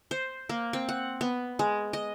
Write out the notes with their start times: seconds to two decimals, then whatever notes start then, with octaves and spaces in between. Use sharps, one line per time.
0.11 C5
0.49 A#3
0.73 C4
0.89 F#5
1.21 B3
1.59 G#3
1.93 D#5